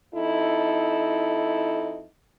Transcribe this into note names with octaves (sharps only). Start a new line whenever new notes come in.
F2 D#4 E4 A4